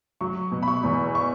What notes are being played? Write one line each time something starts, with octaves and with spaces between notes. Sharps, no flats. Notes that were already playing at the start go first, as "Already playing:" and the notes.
F#3 C#6
B2
B5
C#6
E2
C#6